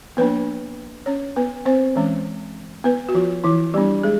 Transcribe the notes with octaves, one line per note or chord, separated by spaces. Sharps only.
F3 A#3 B3 D4 B4
C#4 C#5
B3 B4
C4 C5
E3 G#3 C#4
B3 B4
F#4
F3 F4
E3 E4
G3 B3 D4 G4
G#3 G#4